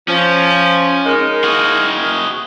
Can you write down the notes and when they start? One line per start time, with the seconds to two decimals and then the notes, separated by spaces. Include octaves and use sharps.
0.08 F3 C#4
1.06 G#3 D#4 A#4
1.44 F#4 G#4